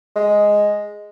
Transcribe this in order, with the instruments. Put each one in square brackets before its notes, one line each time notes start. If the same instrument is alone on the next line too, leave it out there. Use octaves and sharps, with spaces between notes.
[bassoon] G#3